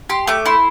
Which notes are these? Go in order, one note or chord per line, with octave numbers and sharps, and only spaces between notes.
G4 C6
A3 D6
E4 C6